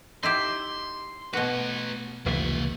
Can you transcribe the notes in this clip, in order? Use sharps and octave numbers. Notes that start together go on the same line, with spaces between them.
D#4 E4 G4 C6
B2 A3 F#4 B4
F1 C#2 E3 A#3 E5